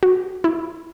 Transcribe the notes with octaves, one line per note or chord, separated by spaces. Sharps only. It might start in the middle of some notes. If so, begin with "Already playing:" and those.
F#4
E4